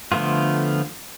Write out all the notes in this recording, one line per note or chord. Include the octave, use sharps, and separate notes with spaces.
D3 F3 A3 B3 F4